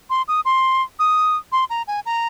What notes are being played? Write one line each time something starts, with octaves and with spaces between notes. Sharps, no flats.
C6
D#6
C6
D#6
C6
A#5
G#5
A#5